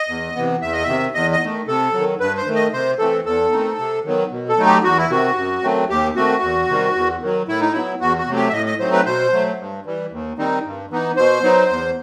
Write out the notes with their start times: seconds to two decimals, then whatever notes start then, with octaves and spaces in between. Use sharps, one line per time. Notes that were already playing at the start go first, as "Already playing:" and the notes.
Already playing: D#5
0.08 E2
0.35 C3 E3 B3
0.62 E2 E5
0.73 D#5
0.83 C3 D#3 E5
1.14 E2 D#5
1.32 D#5
1.41 D#3 A3
1.68 C3 A4
1.93 D#3 F#3
2.20 G2 B4
2.37 C5
2.46 D#3 A3
2.55 D#5
2.73 C3 C5
2.99 E3 A3 C4 A4
3.25 E2 A4
3.52 D#3 A3 C4 D#4
3.78 C3
4.05 D#3 F#3 B3
4.31 B2
4.49 A4
4.57 F#3 A3 D#4
4.66 G4
4.84 E2 F#4
4.98 E4
5.10 C3 D#3 F#4
5.37 F#2
5.63 D#3 F#3 A3 C4
5.89 D#2 G4
6.16 D#3 A3 C4 F#4
6.42 E2
6.69 C3 D#3 G3
6.95 E2
7.21 D#3 F#3
7.48 A2 E4
7.61 D#4
7.73 F#3 B3 E4
8.00 E2 F#4
8.18 F#4
8.27 C3 F#3 A3
8.36 G4
8.48 E5
8.53 A2 D#5
8.66 D#5
8.80 F#3 A3 C4 D#4 C5
8.93 B4
9.06 B2 C5
9.32 F#3 A3
9.59 G2
9.86 E3 G3
10.12 D#2
10.38 D#3 G3 C4 D#4
10.65 G2
10.91 E3 B3 D#4
11.17 B2 C5
11.43 F#3 B3 D#4
11.70 E2